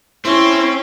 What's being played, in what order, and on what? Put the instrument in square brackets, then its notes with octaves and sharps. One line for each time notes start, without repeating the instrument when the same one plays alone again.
[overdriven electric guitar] C4 [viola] C#4 [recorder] E4 [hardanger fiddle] C6